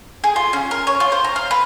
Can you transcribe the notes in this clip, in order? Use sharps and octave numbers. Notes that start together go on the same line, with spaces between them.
G#4
F4
C#4
A#4
C#5
F4
C5
A#5
F5
B4